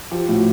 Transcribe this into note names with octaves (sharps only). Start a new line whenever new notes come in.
F3 G4
A2 F#4